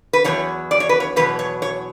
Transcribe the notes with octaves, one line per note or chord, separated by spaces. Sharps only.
B4
E2 B2 F#3 C#5
D5
C#5
B4
C#5
E2 B2 F#3 B4
C#5
C#5